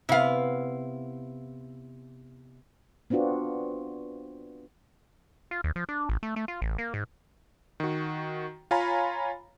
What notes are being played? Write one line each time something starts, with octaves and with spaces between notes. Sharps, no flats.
C3 B3 E4 F5
B3 C4 D4 F4 F#4
F4
D#2
F3
D4
A1
A3
A3
F4
A1
A#3
G#2
D#3 F#4
F4 C#5 F5 G#5 A#5 B5